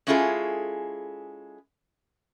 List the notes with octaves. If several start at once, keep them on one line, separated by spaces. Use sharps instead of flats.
G#3 C#4 E4 F4 G#4 A4